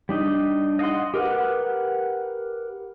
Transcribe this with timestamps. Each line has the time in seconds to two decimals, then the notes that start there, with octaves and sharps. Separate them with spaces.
0.09 G3 D4 D#4
0.79 D#5 F5 F#5 C6
1.14 G4 A#4 B4 F#5